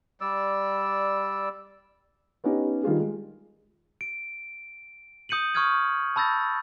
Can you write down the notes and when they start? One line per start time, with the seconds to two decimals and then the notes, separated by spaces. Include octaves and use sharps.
0.21 G3 D5 E6
2.44 B3 C#4 D#4 G4
2.83 D#3 G3 F4 G#4
3.00 G#3
4.01 D7
5.29 D#6 G6 C#7 D#7 F#7
5.54 C#6 D#6 F6 G6 G#6 D#7
6.16 A5 B5 E6 G6 A6 A#6